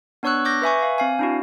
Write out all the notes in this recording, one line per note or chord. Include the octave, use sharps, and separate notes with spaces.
B3 D4 C#5 C#6 E6 F#6
D6 G6 A#6
B4 E5 G#5 C#6
F5
C4 F5 G#5
D4 E4 F#4